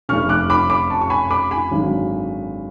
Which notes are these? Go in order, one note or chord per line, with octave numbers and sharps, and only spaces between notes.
F1 F2 C#3 C#6 F6
D6 F#6
B5 D6
B5 D6
A5 C#6
C#6
G#5 B5
B5 D6
G#5 B5
G#1 F#2 D3 F#3